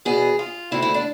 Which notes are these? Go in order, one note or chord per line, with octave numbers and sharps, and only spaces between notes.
E2 B2 B3 G#4
F4
D2 D3 A3 C4 E4
E4
D4